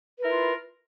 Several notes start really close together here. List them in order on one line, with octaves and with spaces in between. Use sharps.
B4 A#4 E4 F4